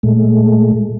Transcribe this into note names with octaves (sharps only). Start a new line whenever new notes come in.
A#2 G#3 A3